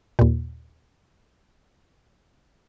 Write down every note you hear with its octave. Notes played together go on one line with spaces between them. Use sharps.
D#2 A#2